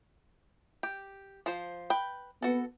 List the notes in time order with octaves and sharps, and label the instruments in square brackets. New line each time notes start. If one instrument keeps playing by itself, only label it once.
[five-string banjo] G4
F3 C5
B4 G5
[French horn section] B3 [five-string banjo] F#4 A4